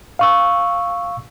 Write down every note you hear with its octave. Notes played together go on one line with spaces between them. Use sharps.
F5 C#6 E6